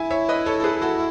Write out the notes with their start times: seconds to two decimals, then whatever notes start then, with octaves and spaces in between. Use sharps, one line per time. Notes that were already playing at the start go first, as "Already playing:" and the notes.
Already playing: E4 E5 G#5
0.10 C#5 E5
0.29 B4 D#5
0.46 A4 C#5
0.60 A4
0.64 G#4 B4
0.82 F#4 A4